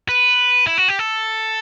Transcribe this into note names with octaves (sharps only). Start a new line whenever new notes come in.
B4
E4
F#4
G4
A4